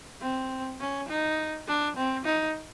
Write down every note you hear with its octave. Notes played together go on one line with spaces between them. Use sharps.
C4
C#4
D#4
D4
C4
D#4